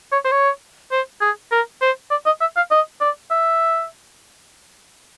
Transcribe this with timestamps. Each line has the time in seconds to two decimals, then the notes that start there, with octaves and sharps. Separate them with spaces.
0.12 C#5
0.25 C5
0.32 C#5
0.92 C5
1.21 G#4
1.52 A#4
1.81 C5
2.11 D5
2.26 D#5
2.41 E5
2.56 F5
2.71 D#5
3.01 D5
3.31 E5